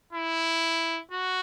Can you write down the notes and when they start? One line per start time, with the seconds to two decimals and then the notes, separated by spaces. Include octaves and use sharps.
0.13 E4
1.11 F#4